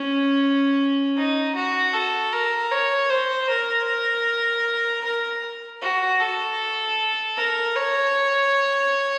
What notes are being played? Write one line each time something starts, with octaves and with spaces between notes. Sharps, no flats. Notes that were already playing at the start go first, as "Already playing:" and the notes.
Already playing: C#4
D#4
F#4
A4
A#4
C#5
C5
A#4
A#4
F#4
A4
A#4
C#5